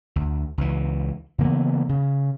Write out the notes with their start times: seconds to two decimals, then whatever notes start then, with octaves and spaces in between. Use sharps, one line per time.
0.16 D2
0.58 C#2 E3
1.38 C#3 E3 A#3 B3
1.89 C#3